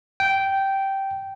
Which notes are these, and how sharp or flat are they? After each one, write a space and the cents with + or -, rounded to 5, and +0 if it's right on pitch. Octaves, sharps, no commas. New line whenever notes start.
G5 -10